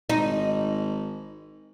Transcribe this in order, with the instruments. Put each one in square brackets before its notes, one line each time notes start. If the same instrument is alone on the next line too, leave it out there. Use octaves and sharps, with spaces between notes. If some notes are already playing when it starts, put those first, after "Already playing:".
[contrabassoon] G#1 [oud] D#4